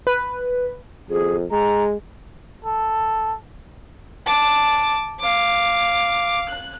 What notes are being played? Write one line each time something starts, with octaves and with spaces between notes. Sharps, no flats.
B4
F2 G#4
G#3 A#5
A4
A5 D6
F5 D6
F#6